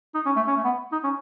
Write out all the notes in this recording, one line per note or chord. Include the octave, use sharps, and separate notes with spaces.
D#4
C#4
A3
C#4
A3
B3
D#4
C#4